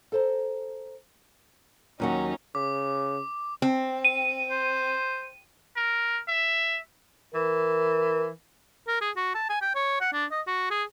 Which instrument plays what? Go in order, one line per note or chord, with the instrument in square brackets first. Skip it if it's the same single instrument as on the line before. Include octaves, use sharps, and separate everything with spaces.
[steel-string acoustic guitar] A4 C5 A#5
[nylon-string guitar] D#2 F#3 F#5 [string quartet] C#4 D#4
[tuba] C#3 [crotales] D6
[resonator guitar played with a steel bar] C4
[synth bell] D#7
[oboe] C5
[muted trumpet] A#4
E5
[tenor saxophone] E3 [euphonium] A#4
[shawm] A#4
G#4
F#4
A5
G#5
G5
C#5
F#5
D4
D#5
F#4
G#4